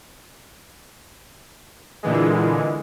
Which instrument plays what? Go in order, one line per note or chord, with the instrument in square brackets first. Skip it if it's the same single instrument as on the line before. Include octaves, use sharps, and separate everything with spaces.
[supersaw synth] A#2 D3 E3 G#3